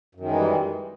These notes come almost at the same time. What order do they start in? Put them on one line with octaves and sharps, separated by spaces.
F#2 D#3 G#3 E3 G3